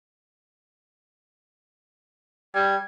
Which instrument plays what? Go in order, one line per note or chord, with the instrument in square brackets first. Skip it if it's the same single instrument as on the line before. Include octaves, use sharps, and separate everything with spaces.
[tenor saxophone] G3 [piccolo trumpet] G#6